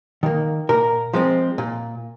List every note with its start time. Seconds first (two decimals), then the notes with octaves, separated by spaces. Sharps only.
0.23 D#3 A#3
0.69 A#2 A#4
1.13 F3 G#3 C4
1.58 A#2